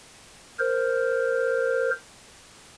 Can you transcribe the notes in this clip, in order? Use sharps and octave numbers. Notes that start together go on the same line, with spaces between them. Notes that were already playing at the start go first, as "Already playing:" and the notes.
A#4 C5